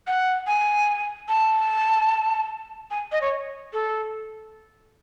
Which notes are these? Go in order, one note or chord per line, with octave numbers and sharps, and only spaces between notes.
F#5
G#5
A5
G#5
D#5
C#5
A4